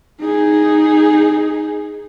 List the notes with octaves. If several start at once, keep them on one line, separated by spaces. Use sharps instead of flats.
D#4 G#4